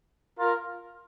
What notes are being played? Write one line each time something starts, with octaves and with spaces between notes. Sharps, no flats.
F4 A#4